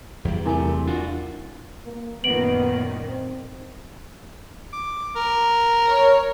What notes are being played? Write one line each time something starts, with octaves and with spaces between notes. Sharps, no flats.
E2 G3
C3 A3 E4 A#4 G#5
D4 F4 F#4
A#3
F#2 A#2 D#3 B3 D7 F#7
C4
D6
A#4
C#5